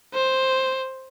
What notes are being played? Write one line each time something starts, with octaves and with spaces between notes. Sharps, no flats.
C5